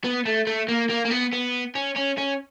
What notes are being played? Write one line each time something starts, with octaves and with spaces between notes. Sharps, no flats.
B3
A3
A3
A#3
A#3
A#3
B3
B3
C#4
C#4
C#4